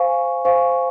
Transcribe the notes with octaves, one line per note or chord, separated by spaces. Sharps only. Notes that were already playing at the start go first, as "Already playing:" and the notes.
Already playing: C5 F5 G#5 C#6
C5 F5 G#5 C#6